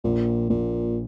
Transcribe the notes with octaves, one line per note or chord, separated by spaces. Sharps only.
A#1 A#2
A#1 A#2